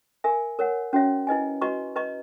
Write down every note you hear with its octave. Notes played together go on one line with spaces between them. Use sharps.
A#4 E5 G#5
A#4 C#5 F#5
C#4 F#4 C#5 E5
E4 B4 D#5 G#5
F#4 B4 D#5 A#5 C#6
B4 D#5 A#5 C#6